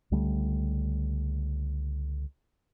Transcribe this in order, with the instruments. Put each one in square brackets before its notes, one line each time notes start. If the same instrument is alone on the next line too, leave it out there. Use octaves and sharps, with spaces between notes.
[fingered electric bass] C#2 D3 G3 A3